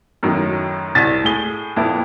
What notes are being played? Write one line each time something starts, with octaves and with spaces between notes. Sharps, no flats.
F#2 A2 D#3 F#3
C2 A6 B6
A2 G#4 G7
F2 A#2 B3 E4